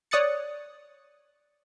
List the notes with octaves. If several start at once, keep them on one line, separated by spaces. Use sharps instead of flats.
C#5 D5 D#6 F#6 A6 C#7